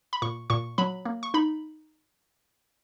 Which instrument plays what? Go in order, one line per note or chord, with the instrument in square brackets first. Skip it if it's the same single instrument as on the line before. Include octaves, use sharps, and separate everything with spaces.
[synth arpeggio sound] B5
A#2 C#6
A#2 C#6
F#3 B5
A#3
C#6
D#4 B5